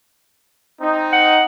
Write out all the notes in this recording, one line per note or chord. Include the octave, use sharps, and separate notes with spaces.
C4 D#4
F#5